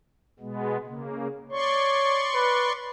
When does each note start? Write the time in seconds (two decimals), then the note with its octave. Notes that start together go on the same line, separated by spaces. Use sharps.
0.40 B2 G#3 B3
0.86 C#3 A#3
1.52 C#5 D5 C6 C#6
2.34 B4